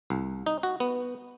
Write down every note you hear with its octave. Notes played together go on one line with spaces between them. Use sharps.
C2
D#4
F#4
B3